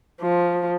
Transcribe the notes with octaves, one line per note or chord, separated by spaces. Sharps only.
F3